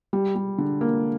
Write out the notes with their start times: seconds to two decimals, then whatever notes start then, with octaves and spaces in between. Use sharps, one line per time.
0.13 G3
0.35 G3
0.58 D3
0.81 A#3